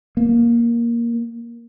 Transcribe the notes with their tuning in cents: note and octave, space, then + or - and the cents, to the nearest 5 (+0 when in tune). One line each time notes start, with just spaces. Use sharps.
A#3 +10